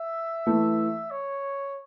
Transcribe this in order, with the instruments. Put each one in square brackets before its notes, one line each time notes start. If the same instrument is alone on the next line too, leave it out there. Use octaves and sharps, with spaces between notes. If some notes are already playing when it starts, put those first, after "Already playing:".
Already playing: [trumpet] E5
[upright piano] E3 A3
[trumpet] C#5